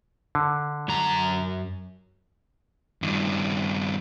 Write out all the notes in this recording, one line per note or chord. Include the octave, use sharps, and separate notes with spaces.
D3
F#2 A#5
G2 D#3